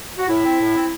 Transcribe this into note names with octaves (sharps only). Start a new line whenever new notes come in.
F#4
A2 E4
C4
A2
C4